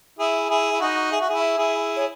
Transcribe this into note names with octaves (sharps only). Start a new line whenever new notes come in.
E4 G#4 E5
E4 G#4
E4
D#4 F#4
G#4 E5
F#4
E4 G#4
E4 G#4
G#4 C#5